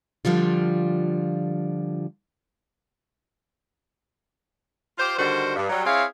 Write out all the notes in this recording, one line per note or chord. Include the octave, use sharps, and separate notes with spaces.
D3 F3 G3 F4
F4 G4 C5
D3 D#3 G3 F#4 C5
G2
F#3 G3
C4 E4 G#4 C#5 F5